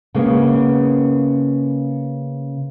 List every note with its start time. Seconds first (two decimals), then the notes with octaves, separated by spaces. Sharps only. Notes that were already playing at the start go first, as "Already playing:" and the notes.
0.14 C#3 A#3 B3